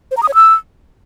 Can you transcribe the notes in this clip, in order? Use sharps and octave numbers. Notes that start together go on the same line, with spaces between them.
C5
A#5
D#6
C#5
E6